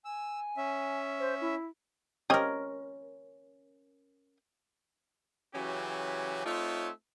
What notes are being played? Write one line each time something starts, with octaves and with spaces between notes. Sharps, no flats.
G#5 E6
C#4 E5
C5
E4
C#4 G4 A#4 C5 D#5
C#3 E3 F#3 C#4 F#4 G4
A3 C4 D#4 F4 C#5 E5